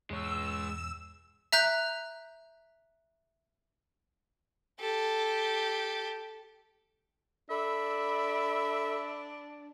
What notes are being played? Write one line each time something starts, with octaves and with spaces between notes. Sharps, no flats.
E2 G#2 B2 G#3 C#5 E6
E5 A#5 F#6 G6
G4 A4
D4 A4 E5 B5